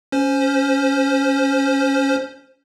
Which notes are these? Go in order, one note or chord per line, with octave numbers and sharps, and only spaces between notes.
C#4 C5